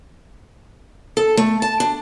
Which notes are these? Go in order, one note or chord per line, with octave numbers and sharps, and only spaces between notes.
A4
A3
A5
D4